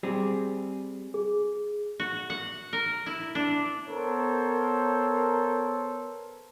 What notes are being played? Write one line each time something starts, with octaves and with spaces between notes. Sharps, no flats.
G3 C4 G#4
G#4
F#4
F#5
A#4
E4
D4
B3 A4 A#4 C5 C#5